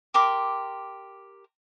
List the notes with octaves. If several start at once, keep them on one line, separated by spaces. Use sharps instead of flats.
G4 A#4 C6 D6